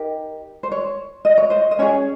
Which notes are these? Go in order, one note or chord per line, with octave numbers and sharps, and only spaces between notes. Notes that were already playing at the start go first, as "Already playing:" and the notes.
Already playing: D#4 G4 A#4
C5
C#5
D#5
C#5
C5 D#5
D#5
C#4 G#4 C#5